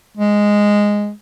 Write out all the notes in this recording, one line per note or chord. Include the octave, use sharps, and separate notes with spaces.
G#3